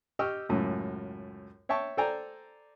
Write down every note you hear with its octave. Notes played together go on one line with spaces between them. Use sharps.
G4 D#5 G5 C#6 E6 F6
C#2 F#2 A2
C#5 E5 G5 A5 C#6
A4 C5 D5 G5 G#5 A#5